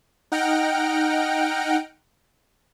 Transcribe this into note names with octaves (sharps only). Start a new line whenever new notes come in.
D#4 F#5 G5 F6 A#6 D7